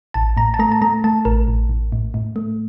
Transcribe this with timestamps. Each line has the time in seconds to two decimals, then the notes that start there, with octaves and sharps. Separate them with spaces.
0.14 A1 A5
0.37 A2 A#5
0.54 A5
0.59 A3 A#5
0.72 A5
0.82 A3 A#5
1.04 A3 A5
1.25 A1 A#4
1.48 A1
1.69 A1
1.92 A2
2.14 A2
2.36 A3